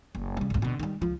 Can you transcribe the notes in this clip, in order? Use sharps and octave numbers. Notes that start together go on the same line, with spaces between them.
F#1
C#3 G3
G#1 D2
B2 D3
D#3 G3
C#2 F3